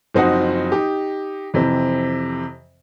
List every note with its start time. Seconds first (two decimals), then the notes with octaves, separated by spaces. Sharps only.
0.14 F#1 F3 C4 D#4 F#4 F#5
0.72 D#4 G4
1.54 F2 C3 E3 C4